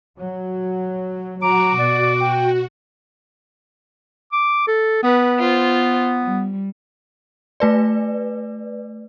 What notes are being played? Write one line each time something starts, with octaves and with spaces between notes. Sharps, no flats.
F#3
F#3 F#4 A#5 D6
B2 D5
G5
D6
A4
B3 B4
F4 C5
G3
A3 B4 D5